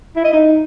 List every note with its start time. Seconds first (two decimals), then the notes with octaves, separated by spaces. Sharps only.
0.16 E4
0.24 D#5
0.33 D#4